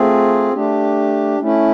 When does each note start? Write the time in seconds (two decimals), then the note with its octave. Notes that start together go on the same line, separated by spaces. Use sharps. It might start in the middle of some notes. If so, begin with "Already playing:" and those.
Already playing: A3 C4 F4 G#4
0.53 A3 D4 G4
1.40 A3 C#4 E4